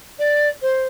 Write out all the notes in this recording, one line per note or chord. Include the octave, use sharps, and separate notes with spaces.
D5
C5